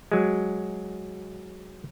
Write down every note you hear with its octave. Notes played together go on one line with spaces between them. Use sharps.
F#3 G#3